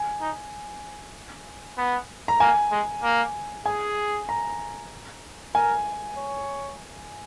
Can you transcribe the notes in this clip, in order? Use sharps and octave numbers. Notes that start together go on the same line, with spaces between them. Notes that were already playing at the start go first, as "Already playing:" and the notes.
Already playing: G#5
D#4
B3
A#5
A#3 G#5
G#3
A#3
G#4 G#5
A#5
A#4 G#5
C#5